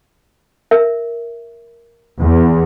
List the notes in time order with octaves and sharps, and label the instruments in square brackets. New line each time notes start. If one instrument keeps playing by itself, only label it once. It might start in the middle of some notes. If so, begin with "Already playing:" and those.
[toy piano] A#4 E5
[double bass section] E2